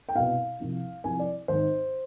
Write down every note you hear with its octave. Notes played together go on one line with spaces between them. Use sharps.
G5
C2 B2 F5
C2 C3 F3
C2 C3 F3 G#5
D5
G#1 G#2 D#3 C5